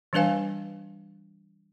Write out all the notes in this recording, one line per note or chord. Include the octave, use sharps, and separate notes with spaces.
E3 G3 D4 B4 F5 G#5